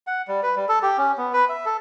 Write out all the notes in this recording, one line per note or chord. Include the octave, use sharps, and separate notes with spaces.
F#5
G3
B4
G3
A4
G4
C#4
B3
B4
E5
A4